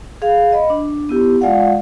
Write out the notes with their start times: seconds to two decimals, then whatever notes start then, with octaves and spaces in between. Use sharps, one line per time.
0.22 G#4 F5
0.52 D#5 B5
0.70 D4
1.09 B3 E4 G4
1.41 G#3 F4 D5 F5 F#5